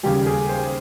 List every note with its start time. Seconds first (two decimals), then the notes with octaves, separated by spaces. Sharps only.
0.03 D#2 C#3 G3 G4
0.26 G#4
0.49 C5